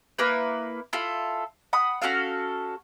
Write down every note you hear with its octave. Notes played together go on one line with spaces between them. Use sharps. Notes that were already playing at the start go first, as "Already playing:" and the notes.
A#3 E4 B4
E4 F4 A4
F#5 B5 D#6
C#4 F#4 A4 F5